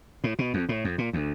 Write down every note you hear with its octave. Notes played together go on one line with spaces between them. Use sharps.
A2
B2
F2
A2
F2
A#2
D2